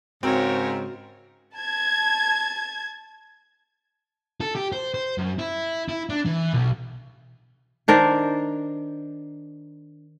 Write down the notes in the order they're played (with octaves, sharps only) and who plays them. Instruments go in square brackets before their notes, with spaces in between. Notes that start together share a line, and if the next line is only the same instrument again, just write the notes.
[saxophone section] G#2 C#3 [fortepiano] C4 [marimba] F#4 [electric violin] A#4 C#5
[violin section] A5 G#6
[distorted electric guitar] A4
G4
C5
C5
F#2
E4
E4
D4
E3
B1
[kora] D#3 D4 A#4 C5